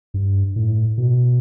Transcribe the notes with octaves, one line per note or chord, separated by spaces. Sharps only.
G2
A2
B2